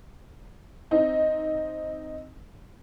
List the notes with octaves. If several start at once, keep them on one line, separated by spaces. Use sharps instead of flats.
C4 D#4